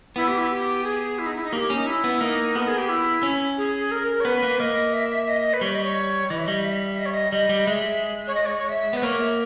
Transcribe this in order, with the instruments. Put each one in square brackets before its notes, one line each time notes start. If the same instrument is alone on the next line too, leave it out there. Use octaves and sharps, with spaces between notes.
[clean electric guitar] B3 [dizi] E4
[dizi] G4
E4
G4
G#4
E4
D#4
E4
D#4
[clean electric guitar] A#3 [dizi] G4
[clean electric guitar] C#4
[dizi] D#4
E4
[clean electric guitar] B3
[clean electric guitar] A#3 [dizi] D#4
[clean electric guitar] B3 [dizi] A#4
[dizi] G#4
G4
E4
[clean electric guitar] C#4
[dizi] G#4
A#4
C#5
[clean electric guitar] B3 [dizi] B4
[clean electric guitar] A#3
[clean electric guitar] A#3 [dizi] D#5
[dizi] E5
D#5
B4
[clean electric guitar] G3 [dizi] C#5
[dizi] D#5
C#5
[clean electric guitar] E3 [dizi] D#5
[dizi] E5
[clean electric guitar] G3 [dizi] D#5
[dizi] E5
D#5
C#5
D#5
[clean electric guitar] G3 [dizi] D#5
[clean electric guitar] G3
[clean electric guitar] G#3 [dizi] E5
[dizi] C#5
D#5
C#5
C#5
E5
[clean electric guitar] B3 [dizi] B4
[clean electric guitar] A#3 [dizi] C#5
[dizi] E5